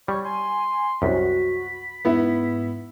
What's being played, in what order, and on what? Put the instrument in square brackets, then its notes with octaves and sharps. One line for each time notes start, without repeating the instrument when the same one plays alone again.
[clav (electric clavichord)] G3 [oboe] C#5
[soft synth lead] G#5 [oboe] C6
[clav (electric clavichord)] C2 F#2 [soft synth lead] F#4 [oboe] B5
[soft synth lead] G#2 [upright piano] B3 E4